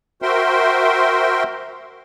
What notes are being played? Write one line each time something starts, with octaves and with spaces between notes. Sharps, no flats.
F#4 A#4 C5 E5 G5 C6